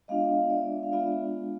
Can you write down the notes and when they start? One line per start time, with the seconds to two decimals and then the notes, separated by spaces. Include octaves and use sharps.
0.08 G#3 B3 D4 F4 D#5 F5
0.50 D5 E5
0.83 F5
0.92 G#3 B3 D4 F4 D5 E5